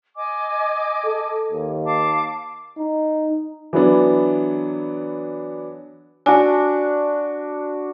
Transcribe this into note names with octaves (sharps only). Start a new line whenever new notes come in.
D#5 G#5 D6
A4
D#2
F5 A5 D6
D#4
E3 F#3 B3 D4
D4 F#4 G#5